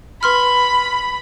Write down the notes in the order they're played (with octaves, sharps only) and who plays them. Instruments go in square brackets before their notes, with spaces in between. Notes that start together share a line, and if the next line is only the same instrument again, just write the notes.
[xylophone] B4 C6 F6 [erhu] B5